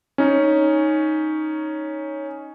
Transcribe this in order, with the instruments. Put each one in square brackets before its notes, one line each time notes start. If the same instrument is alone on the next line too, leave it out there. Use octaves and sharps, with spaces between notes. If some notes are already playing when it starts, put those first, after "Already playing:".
[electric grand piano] C#4 D#4